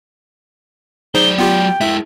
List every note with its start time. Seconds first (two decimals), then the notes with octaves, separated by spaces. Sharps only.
1.15 F#3 D#4 G#4 C5 D5 G7
1.38 B3 F4 G4 G5
1.81 G#3 E4 E5